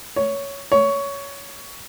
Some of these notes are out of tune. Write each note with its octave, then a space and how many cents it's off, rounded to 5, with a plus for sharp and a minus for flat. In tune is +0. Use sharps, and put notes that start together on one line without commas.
C#5 +10
C#5 +15